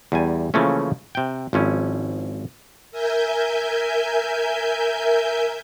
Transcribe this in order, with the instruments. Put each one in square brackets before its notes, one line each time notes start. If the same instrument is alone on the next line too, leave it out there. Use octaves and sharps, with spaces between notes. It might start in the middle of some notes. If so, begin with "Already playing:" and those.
[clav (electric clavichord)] E2 G3 G#5
C#3 E3 F3 A3 A#3 C#4
C3 G5
G#1 F3 C#4 E4
[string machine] A#4 E5 G#5 G6